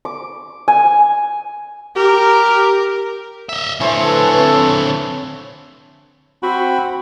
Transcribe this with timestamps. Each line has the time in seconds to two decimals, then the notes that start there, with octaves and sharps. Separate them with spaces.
0.05 D6
0.68 G#5
1.96 G4 A#4
3.49 D#5 E5
3.80 D3 E3 A3 C5 C#5
4.01 A4 B4
4.37 C4
6.43 C4 F#4 G5 B5